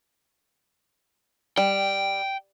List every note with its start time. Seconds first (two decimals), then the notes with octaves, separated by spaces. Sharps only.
1.57 G3 G5